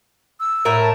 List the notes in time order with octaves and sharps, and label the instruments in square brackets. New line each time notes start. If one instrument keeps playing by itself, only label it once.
[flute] E6
[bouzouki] A2 A#4 E5
[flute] A5